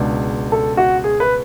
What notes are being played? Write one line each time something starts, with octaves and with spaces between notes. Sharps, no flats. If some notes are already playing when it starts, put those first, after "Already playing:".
Already playing: C#2 B2 G#3 D4
A4
F#4
G#4
B4